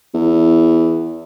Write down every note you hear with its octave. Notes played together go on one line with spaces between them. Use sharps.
E2